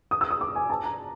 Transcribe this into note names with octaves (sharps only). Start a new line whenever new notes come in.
D#6
E6
D#6
D6
G#5
A5
A#5